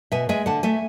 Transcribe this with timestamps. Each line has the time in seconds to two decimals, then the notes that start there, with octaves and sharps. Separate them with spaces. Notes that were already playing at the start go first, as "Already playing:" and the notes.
0.12 B2 E5 G#5
0.29 G#3 E5 G#5
0.46 D3 F#5 A5
0.63 A3 E5 G#5